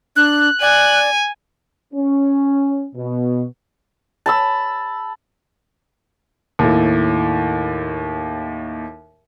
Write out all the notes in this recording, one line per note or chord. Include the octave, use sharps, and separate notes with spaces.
D4 F#6
D5 G#5
C#4
B2
A5 B5 E6
D#2 A2